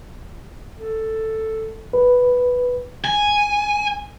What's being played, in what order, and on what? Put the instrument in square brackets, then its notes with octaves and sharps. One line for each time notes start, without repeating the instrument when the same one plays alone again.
[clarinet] A4
[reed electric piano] B4
[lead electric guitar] G#5